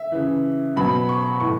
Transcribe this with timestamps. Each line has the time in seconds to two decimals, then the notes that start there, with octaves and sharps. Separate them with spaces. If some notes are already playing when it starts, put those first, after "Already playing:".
Already playing: E5
0.12 C#3 E3
0.76 B2 F#3 B5
1.09 C#6
1.40 A2 E3 C#6